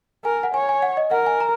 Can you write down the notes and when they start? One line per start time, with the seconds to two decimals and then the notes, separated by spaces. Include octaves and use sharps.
0.25 A#4 G#5
0.43 F#5
0.54 C#5 G#5
0.69 G#5
0.82 F#5
0.97 D#5
1.11 A#4 F#5
1.26 G#5
1.40 A#5